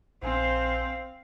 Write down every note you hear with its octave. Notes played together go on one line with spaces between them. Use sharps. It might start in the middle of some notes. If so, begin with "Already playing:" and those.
A#1 C4 C5 F5 G#5 C7